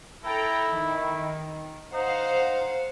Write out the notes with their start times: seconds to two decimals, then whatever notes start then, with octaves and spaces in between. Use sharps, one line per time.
0.25 E4 A4 G5 A#5
0.71 D#3
1.94 D#4 C5 F5 F#5